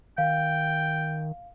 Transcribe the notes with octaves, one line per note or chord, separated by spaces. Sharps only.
D#3 F5 G5